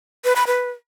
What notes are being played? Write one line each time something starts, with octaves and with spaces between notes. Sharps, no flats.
B4
B5
B4